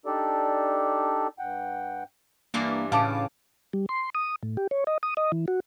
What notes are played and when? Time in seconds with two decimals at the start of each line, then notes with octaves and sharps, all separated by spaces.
0.06 D4 D#4 G4 A4 D5
1.39 G2 F#5 G5
2.54 G2 E3 A#3 D4
2.92 A2 C#3 F5 A5 D6
3.73 G3
3.89 C6
4.15 D#6
4.43 A2
4.57 G4
4.71 C#5
4.87 D#5
5.03 D#6
5.17 D#5
5.32 E3
5.48 F#4